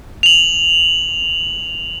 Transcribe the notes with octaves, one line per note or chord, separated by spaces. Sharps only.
F7 F#7